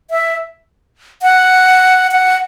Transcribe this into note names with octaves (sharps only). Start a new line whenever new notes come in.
E5
F#5
F#5